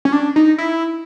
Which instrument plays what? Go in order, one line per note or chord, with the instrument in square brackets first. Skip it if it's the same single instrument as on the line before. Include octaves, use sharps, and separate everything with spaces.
[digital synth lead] C#4
D4
D#4
E4